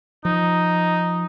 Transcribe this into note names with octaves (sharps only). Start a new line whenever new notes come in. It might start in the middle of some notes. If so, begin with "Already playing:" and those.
F3 D#4